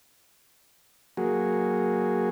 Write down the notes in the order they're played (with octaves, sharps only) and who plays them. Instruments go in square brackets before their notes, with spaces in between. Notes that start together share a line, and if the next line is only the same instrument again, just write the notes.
[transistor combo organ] F#3 A#3 F#4 G#4